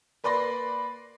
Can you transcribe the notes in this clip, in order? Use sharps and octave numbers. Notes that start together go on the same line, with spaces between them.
A#3 B4 D5 B5 C6 A#6